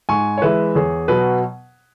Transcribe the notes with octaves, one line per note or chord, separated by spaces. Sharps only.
G#2 G#5 C#6
C#5
E3 G#3 B4 E5
E2 G#4 C#5
B2 F#3 B3 B4